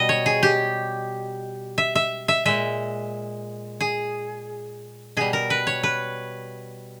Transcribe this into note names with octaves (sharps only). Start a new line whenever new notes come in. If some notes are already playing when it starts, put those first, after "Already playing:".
Already playing: B2 G3 D#5
C#5
G#4
G4
E5
E5
E5
A#2 G#3 E5
G#4
B2 G3 G#4
A#4
B4
C#5
B4